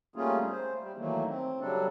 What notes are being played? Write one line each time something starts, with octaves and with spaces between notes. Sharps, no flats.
G3 A3 A#3 C#4 F4 G#4
C5
G3
D#3 E3 F#3 A3 A#3
C4
C#3 F#3 G3 D4 A4